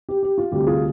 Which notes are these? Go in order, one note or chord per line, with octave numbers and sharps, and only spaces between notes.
G4
G4
F4
D2 C3 G3 G4
F4 G#4